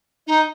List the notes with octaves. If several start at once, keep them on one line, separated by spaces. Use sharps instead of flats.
D#4